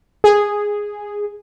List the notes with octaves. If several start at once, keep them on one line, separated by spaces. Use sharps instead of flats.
G#4